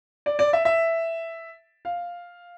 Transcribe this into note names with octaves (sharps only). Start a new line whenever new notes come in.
D5
D5
E5
E5
F5